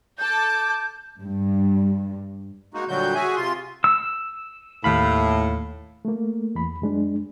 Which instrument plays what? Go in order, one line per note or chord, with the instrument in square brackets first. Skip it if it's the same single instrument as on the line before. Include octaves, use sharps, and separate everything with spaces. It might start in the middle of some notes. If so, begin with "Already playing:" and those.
[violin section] A4 A5 D6 [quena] G6
[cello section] G2
[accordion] G#3 A#3 D#4 F#4
A#2 D3 F#3 G3 F#4 G6
F#4 G#4 E5 G#5
C3 F4 C6
[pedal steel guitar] E6
[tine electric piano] D#2 F5 B5 [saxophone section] A2
[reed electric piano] A3 A#3
E2 B5
F#2 G#3 D4